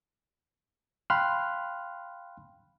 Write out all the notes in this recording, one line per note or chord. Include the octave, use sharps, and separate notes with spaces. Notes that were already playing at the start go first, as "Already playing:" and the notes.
F5 G5 B5 C6 F6 F#6